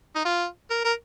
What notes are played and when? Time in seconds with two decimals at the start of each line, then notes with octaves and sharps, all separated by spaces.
0.15 D#4
0.25 F4
0.70 A#4
0.85 A#4